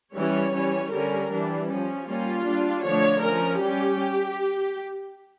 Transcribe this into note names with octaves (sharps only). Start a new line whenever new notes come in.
E3 G3 C#4 C#5
E3 G3 C#4
D3 G3 C#4 A#4
E3 G3 D4
F3 C#4
G3 A#3 C#4 F4
G3 D4
D3 F3 A3 D4 C#5
F3 C#4 A#4
G3 C#4 G4